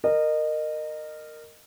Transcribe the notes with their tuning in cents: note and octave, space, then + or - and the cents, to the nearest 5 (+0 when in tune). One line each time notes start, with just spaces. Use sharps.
A#4 -10 D#5 -25